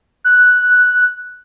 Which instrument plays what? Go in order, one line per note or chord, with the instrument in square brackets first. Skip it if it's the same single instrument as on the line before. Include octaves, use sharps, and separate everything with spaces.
[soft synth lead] F#6